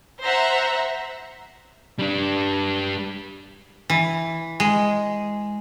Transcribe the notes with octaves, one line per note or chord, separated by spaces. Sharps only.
C5 E5 F#5 A#5
G3 D4
E3
G#3